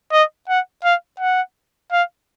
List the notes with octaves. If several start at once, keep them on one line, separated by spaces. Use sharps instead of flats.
D#5
F#5
F5
F#5
F5